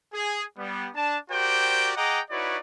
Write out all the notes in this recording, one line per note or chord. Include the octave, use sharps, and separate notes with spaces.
G#4
G3 B3
D4 A5
F#4 G4 A#4 C5 D5 G5
G#4 D#5 F#5 G5 A#5 D6
D#4 E4 F#4 B4 C#5 D5